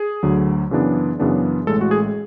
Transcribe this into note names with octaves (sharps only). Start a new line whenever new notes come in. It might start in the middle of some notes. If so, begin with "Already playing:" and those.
Already playing: G#4
D2 D3 F#3
F#2 C#3 E3 B3 D4
F#2 C#3 E3 B3 D4
A1 A2 G#3 A4
F#4
G#4